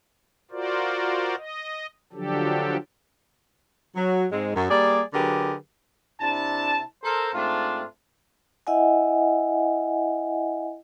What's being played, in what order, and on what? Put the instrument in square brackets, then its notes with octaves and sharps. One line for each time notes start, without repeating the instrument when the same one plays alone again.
[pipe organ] F4 F#4 A#4 C5 D5
D#5
D3 F3 F#3 D4 G4 A4
[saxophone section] F#3
G#2 G#3 C4
F#2
G3 A#3 G#4 D5
D3 F#3 G4 G#4 A#4 B4
[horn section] C3 D4 E4 A5
A4 A#4 C5
G#2 A3 C4 D4 F4
[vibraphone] E4 D#5 E5 F#5 G#5